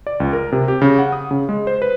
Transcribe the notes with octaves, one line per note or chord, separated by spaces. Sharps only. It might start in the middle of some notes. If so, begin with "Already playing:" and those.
D5
C#2
A#4
C3
G4
C#3
F#5
D#6
C#3
G#3
C5
B4